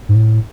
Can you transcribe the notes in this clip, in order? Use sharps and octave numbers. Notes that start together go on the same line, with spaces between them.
G#2
A2